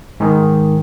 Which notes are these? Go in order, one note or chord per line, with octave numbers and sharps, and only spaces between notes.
G#2 D#3